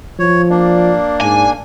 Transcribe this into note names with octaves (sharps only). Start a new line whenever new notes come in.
F3 C#5
A#3 D4 D5
G#2 G#5